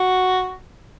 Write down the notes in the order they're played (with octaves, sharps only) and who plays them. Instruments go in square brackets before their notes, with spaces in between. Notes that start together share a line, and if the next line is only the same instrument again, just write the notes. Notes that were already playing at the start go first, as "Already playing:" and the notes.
Already playing: [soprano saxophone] F#4